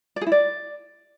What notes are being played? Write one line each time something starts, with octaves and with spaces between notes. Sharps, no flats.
D5
G#4
E4
D5